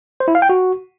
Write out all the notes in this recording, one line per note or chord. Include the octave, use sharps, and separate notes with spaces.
C5
E4
F5
G5
F#4